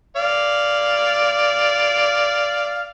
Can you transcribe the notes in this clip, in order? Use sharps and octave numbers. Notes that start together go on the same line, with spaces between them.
D5 F5